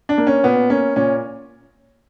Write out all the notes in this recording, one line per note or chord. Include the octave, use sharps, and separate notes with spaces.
D4
A#3
C#4
A#2 B3
A#3 C#4
A#2 C#4